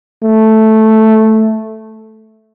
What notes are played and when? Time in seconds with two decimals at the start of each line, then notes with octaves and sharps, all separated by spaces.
0.24 A3